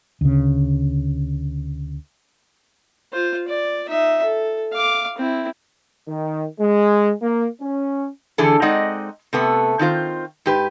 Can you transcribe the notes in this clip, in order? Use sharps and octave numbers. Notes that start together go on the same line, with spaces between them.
D2 C#3
F4 C5
D5
D#4 E5
A4
F5 D6
C4 E4
D#3
G#3
A#3
C#4
D3 E3 G#4 A4
G#3 C4 D#4 D5 D#5 F#5
C3 A3 B3
D#3 C4 F4 C5
G#2 G4 B4